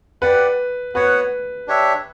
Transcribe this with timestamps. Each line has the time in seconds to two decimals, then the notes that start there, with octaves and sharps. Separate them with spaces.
0.22 G4 B4 D5 F#5
0.95 B3 F#4 B4 C#5 F#5
1.68 D4 G4 C#5 E5